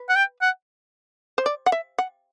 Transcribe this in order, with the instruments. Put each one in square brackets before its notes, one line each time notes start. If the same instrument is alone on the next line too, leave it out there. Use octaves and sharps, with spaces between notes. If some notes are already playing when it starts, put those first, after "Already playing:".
Already playing: [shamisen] B4
[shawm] F#5
G5
F#5
[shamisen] C5
D5
F#5
E5
F#5